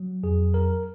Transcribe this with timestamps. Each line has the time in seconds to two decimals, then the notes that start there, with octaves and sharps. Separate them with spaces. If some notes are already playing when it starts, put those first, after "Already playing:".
Already playing: F#3
0.23 F2 G#4
0.54 A#4